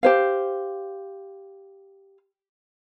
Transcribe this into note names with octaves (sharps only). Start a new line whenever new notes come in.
G4 C5 F5